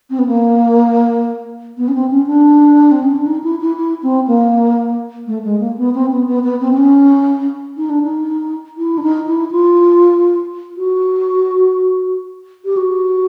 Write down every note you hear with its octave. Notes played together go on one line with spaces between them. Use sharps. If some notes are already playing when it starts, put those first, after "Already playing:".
C4
B3
A#3
B3
C#4
C4
C#4
D4
C4
C#4
D4
D#4
E4
E4
E4
C4
A#3
A3
G#3
A#3
B3
C4
B3
B3
B3
C4
C4
C#4
D#4
D4
D#4
E4
D4
D#4
E4
F4
F#4
G4
F#4